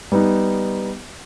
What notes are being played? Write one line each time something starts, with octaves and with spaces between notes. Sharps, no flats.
G3 B3 D#4